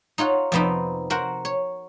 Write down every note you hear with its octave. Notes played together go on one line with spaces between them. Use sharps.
D#4 F4 C#5 F#5
F2 C3 B3 C4 D#4
F#4 A#4 C5 F#5
C#5